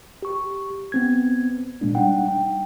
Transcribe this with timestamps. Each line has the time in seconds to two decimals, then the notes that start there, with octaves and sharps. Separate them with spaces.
0.22 G4 C#6
0.92 B3 C4 G#6
1.81 A#2 G#3 A#3 D4
1.95 G3 D4 D#4 F#5 G5
2.28 G5